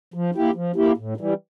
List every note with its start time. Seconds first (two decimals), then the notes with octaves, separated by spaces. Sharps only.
0.14 F3
0.35 A#3 E4 G4
0.55 F3
0.76 A#3 E4 G4
0.97 A2
1.17 E3 G3